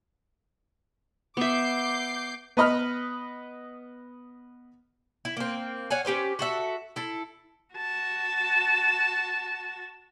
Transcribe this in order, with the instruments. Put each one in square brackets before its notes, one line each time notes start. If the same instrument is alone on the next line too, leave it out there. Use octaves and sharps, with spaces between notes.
[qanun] B3 E5 [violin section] D6 G6 C7
[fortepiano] B3 B4 D#5 B5 F6
[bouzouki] E4
A#3 C4
C#5 F5 F#5 G#5
C#4 G4 B4 C5
F#4 A4 E5
E4 A4
[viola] F#4 A5